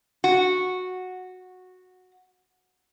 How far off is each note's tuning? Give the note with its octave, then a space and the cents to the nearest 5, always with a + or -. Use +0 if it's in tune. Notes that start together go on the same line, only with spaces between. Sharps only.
F#4 -10